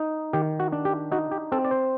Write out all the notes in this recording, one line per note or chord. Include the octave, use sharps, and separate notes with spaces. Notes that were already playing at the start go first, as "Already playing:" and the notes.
Already playing: D#4
D#3 G4
F#4
D4
G4
D#4 F#4
G4
C4 A4
D5
C5